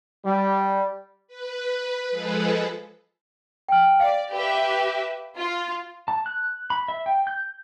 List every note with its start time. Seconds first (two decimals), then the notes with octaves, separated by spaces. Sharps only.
0.24 G3
1.28 B4
2.10 F3 G#3 G#4 A4 B4
3.69 G5 F6
4.00 D5 F5
4.31 G4 B4 E5
5.38 F4
6.08 A5
6.26 F#6
6.70 B5
6.88 E5
7.06 G5
7.27 G6